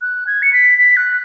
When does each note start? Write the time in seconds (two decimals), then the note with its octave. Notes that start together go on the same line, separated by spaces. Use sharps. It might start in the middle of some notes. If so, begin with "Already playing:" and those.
0.02 F#6
0.27 G#6
0.42 C#7
0.53 B6
0.78 B6
0.97 F#6